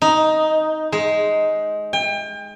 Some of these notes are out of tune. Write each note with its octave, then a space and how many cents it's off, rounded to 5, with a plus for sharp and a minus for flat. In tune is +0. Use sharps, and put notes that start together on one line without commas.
D#4 +5
G#3 +10
G5 +35